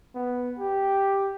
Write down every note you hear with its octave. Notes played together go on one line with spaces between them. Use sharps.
B3
G4